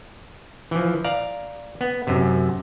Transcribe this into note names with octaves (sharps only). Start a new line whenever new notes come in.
E3 F3
D5 F5 A#5
B3
F#2 C3